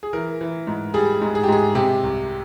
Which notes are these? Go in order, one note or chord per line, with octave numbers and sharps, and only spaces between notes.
G#4
E3 A#4
E3
G#2
G3 G#4
G#2
G#4
G4
G#2 G#4
C3 G4
C2